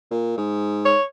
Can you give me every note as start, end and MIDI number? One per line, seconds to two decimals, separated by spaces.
0.11 0.33 46
0.38 0.95 44
0.85 1.03 73